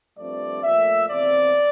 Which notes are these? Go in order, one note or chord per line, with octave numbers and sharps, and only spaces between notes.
G2 F3 A3 C4 D5
A#2 F3 A3 E5
E2 C3 F3 C4 D5